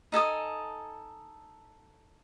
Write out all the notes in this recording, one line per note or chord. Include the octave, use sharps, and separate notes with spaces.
D#4 A4 G#5 D#6